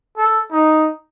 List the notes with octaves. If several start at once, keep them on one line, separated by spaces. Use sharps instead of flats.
A4
D#4